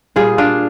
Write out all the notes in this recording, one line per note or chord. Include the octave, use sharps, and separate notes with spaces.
A#2 G3 F4 G#4
D4 F4